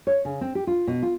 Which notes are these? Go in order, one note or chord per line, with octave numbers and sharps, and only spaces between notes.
C#5
C#3
C4
G4
F4
B2
F4